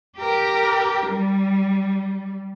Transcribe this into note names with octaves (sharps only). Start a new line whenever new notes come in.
G4 A#4
G3